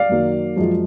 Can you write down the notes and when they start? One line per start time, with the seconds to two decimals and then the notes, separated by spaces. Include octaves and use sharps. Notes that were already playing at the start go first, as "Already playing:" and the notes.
Already playing: D5 F5
0.09 F#2 D#3 F#3 A#3
0.56 F#2 F3 G#3